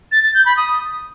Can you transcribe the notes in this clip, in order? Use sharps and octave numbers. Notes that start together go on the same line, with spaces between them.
A6
A6
G6
B5
D#6